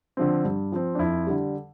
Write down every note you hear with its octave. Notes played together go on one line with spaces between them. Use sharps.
D3 F3 C4
G2
F3 C4
D4
F2 E4
D3 G3